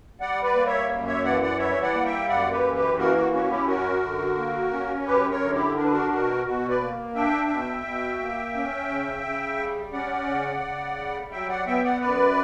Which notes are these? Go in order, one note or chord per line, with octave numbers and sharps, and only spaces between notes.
G3 D5 F#5
B4 D5
A#3
C#5 E5
F#2
C#5 E5
E3 D5 F#5
D5 F#5
G3 C#5 E5
D5 F#5
A#3
E5 G5
F#2 D5 F#5
G4 B4
E3
G4 B4
A#3 F#4 A#4
F#4
C#4 F#4
E4 G4
F#2 F#4 A#4
D3
A#3
C#4
F#2 G4 B4
A#4 C#5
D3
E4 G4
D4 A#4
B4
F#4 A#4
B2 F#4 A#4
B2 F#4
B4 D5
A#3
D4 E5 G5
B2
B2
A#3
C#4
C#3
C#3
G3
C#4 D5 F#5
C#3
C#3
G3
F#3 E5 G5
D5 F#5
B3 E5 G5
D5 F#5
F#2 B4 D5